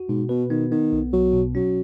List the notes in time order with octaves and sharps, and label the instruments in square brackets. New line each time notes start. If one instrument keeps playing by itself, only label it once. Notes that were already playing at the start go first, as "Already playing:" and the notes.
Already playing: [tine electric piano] F#4
[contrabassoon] G#2 [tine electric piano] B2
[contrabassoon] B2 [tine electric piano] B4
[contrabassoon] D#3 [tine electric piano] B3
[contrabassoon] D#3 [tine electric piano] B3
[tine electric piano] B1
[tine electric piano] B1 [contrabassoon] F#3
[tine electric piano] B2
[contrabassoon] F#3 [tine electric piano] C#4